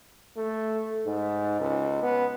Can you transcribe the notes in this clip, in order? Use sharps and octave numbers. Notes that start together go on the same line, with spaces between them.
A3
G#2
C#2
B3